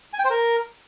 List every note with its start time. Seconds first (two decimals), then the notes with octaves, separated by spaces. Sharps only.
0.13 G#5
0.19 G5
0.25 C5
0.30 A#4